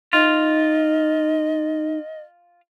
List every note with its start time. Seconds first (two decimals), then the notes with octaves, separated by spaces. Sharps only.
0.13 D#4 F4 D#5